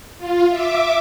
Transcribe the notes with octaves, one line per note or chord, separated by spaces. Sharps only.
F4
E5 D6